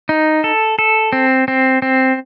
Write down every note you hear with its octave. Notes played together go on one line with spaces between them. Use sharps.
D#4
A4
A4
C4
C4
C4